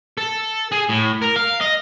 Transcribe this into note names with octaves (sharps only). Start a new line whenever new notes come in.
A4
G#4
A2
A#4
F5
D#5